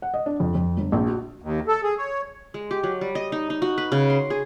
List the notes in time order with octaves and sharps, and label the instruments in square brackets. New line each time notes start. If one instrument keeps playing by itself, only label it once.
[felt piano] F#5
D#5
D4
F2
F2
G1
A#1
F#4
[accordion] D#2
A4
G#4
C#5
[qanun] G#3
G4
F#3
G3
D#5
D#4
D#4
F#4
B4
C#3
C6
G#4